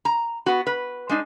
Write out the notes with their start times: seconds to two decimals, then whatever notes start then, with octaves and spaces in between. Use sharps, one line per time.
0.05 A#5
0.46 B3 F#4
0.67 B4
1.09 G#3 D4 D#4